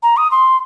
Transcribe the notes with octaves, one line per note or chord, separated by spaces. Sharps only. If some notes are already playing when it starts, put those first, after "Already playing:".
A#5
D#6
C6